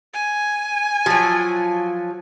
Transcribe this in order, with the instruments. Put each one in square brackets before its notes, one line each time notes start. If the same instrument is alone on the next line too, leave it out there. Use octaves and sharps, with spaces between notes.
[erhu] G#5
[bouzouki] F3 F#3